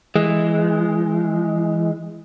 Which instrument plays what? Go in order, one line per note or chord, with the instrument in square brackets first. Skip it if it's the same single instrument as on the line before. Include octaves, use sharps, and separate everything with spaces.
[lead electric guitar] E3 [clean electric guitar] G#3